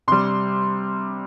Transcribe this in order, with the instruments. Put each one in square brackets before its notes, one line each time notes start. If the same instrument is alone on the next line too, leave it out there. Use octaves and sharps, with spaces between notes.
[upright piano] C3 G3 C6